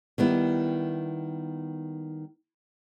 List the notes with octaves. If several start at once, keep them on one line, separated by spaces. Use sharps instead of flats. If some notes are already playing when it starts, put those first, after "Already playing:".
D#3 G3 B3 E4